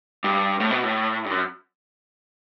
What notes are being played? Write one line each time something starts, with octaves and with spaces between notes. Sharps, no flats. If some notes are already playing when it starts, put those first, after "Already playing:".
G2
A2
B2
A2
G2
F#2